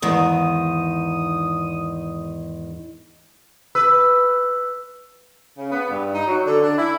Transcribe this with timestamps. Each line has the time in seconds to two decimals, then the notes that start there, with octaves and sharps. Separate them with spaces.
0.02 E2 G#2 D#3 D#6
3.75 B4 E6
5.57 C#3
5.71 B3
5.89 G2
6.14 D#4
6.27 F#3
6.45 D3
6.62 D4
6.77 E4